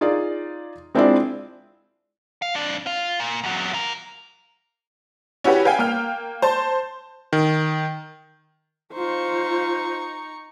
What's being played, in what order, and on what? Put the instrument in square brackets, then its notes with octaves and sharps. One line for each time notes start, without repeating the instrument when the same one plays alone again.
[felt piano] D#4 F4 G#4 D5
G#3 C4 D4 E4 F4 D5
[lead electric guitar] F5
F2 D4
F4
A#2
E2 F#3
F4 A#4
[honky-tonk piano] C#4 E4 F#4 G4 B4
B4 F5 G5 G#5
A#3 G5 F6
C5 A5
[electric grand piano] D#3
[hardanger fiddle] D#4 C#6 [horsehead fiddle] F4 C5